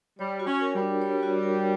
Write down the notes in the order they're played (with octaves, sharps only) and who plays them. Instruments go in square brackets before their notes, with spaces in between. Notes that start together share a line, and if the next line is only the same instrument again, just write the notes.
[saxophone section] G3 [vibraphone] C#5
[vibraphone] F#4
[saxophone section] C#4
[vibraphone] A#4
[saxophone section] G3
[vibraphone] D4
C#5
F#4
A#4